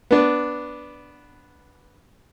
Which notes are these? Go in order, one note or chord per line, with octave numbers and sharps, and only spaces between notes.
B3 D4